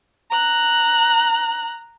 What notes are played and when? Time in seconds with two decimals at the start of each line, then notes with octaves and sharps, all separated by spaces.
0.31 A#5 F#6